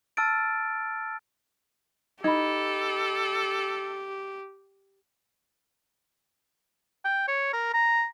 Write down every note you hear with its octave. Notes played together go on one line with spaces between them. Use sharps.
A5 E6 F6 A6 D7
D#4 G4 A4 B5 G#6
G5
C#5
A#4
A#5